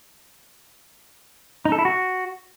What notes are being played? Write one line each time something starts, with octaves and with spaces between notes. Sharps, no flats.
D#4
A4
E4
F#4